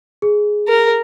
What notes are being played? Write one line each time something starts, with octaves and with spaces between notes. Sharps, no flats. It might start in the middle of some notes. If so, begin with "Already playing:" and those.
G#4
A#4